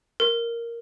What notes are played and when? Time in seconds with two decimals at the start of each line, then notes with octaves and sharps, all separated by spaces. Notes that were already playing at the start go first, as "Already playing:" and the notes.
0.20 A#4